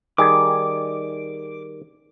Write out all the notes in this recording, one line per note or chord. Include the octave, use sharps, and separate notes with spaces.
D#3 G3 G#4 D6